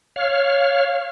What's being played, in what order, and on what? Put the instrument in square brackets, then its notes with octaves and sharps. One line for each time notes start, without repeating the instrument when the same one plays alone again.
[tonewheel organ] C#5 F5 F6